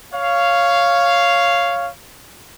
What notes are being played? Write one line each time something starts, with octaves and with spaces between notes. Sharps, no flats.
C#5 F5